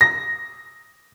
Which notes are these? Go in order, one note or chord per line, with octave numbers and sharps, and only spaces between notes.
A#6